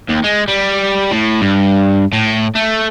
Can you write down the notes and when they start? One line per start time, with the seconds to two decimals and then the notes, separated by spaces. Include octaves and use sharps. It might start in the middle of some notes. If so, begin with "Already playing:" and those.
0.09 D#2
0.24 G#3
0.48 G3
1.11 A2
1.41 G2
2.13 A2
2.55 A3